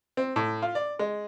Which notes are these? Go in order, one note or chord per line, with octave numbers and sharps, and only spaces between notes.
C4
A2
F4
D5
G#3